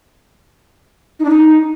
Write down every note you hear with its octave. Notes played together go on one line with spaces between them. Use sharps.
D#4
D4
D#4